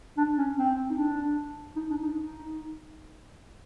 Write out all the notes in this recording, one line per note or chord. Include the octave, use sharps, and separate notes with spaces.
D4
C#4
C4
D#4
D4
D#4
D4
D#4
D#4